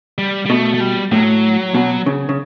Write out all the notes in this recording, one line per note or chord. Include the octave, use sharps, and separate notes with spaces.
G3
G3
B2 A3
A3
G3
A2 F#3
B2
C#3
C#3